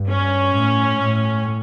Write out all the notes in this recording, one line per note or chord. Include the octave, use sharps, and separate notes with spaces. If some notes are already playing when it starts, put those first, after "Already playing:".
Already playing: G2
C#4
A2
A2